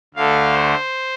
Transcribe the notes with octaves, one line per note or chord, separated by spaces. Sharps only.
D2 D3 A3 F5
C5